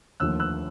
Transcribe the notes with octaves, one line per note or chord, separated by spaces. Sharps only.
D#2 D3 F3 A3 E6 F#6
E6 F#6